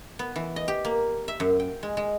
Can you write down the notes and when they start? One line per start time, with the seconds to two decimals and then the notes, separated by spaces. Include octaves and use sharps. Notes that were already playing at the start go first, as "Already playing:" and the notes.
0.19 B3
0.36 E3
0.56 D#5
0.68 G4
0.85 A#3
1.28 E5
1.40 F#2
1.60 G5
1.83 G#3
1.97 G#3